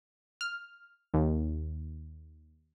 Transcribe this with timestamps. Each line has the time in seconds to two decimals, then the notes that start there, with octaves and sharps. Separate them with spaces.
0.41 F6
1.14 D#2